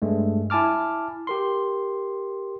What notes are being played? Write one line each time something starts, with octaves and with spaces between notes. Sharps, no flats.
G2 G#3 A3
E4 G#5 A5 D6 F6
G4 A#4 C6